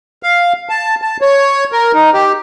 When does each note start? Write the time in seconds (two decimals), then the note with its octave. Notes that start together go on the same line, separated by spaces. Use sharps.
0.23 F5
0.69 A5
1.02 A5
1.22 C#5
1.72 A#4
1.94 D#4
2.13 G4